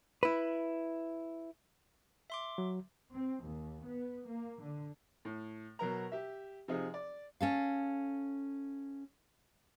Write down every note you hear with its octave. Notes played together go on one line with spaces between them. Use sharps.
E4 B4
E5 C6 D6
F#3
C4
D#2
B3
A#3
D3
A2
B2 F#3 A#4 A#5
G4 E5
C3 F3 D#4 G#4
D5
C#4 A4 F5